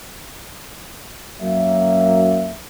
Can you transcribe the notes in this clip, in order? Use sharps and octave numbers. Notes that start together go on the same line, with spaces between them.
F#2 F#3 A#3 E5